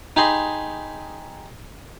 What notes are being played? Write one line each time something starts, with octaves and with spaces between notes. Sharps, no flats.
D#4 G4 G#4 D#5 B5 C6